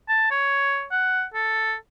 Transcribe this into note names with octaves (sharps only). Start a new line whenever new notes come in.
A5
C#5
F#5
A4